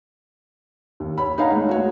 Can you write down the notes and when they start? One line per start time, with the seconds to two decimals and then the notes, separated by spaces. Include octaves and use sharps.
1.00 D#2
1.18 C#5 B5
1.38 D#4 C#5 F5 F#5 A#5
1.52 G#3 A3
1.69 F#4 C#5